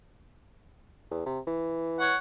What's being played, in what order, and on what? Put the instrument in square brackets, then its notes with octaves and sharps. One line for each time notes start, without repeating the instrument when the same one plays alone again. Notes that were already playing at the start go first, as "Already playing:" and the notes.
[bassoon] E2
C3
E3
[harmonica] C#5 F#5